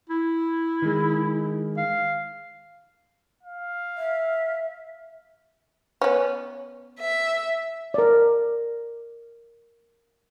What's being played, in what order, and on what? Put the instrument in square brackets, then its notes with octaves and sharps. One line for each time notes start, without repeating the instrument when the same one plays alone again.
[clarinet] E4
[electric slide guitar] D#3 G#3
[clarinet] F5
[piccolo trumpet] F5
[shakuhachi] E5
[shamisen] B3 C#4
[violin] E5
[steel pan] A#4 D5